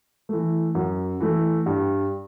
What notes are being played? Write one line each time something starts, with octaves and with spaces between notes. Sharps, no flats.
E3 A3
F#2
E3 A3
G2